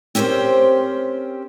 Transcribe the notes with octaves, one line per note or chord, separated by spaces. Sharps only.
C4 C#4 G4 A#4 C5